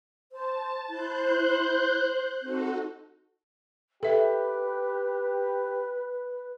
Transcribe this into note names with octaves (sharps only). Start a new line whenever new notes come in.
C5 A5
E4 C5 F#6 G6
C4 D#4 F#4 A4
G4 A4 B4 E5